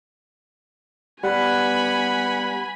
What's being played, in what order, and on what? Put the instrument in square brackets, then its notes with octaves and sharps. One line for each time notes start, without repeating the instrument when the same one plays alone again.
[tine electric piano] G3 [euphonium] B3 [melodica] F#5 [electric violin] G#5 B5